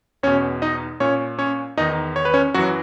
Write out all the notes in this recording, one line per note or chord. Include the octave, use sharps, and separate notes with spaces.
E2 B2 C#4 C#5
D#4 D#5
A#2 C#4 C#5
C#4 C#5
E2 D#3 D#4 D#5
C#5
B4
C#4 C#5
F#2 E3 F#3 F#4